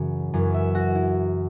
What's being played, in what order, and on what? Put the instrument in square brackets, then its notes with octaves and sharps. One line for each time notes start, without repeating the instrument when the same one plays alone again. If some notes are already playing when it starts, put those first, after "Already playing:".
Already playing: [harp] F#2 C#3 E3
F#2 E3
E5
F#4
E4